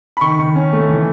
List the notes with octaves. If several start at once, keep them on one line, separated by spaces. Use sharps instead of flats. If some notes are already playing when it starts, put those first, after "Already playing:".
B5
D#3 C#6
D#3
C#4
A3
E3